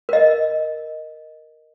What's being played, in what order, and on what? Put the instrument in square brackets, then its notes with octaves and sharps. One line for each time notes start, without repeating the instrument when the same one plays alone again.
[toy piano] A#4 D#5